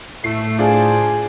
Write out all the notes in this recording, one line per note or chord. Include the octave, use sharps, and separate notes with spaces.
A2 A3 C7
D4 F4 G#4 C5 D5 G#5 A5